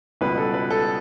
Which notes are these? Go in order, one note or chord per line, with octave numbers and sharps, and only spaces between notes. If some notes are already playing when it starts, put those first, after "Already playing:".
C#2 B2 G3 B3 B4
A4
B4
A4